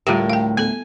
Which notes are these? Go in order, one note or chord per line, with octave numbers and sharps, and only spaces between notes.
D2 A2 G3 F4 G4 A#4
F5 G5
B3 A4 G#5